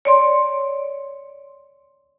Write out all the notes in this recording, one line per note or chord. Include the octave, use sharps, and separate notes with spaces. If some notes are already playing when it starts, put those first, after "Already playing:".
C#5 D5 C6